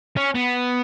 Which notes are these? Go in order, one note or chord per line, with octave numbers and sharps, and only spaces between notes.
C#4
B3